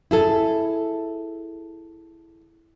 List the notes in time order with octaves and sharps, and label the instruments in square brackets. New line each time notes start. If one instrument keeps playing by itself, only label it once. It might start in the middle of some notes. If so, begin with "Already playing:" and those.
[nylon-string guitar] E4 G#4 A4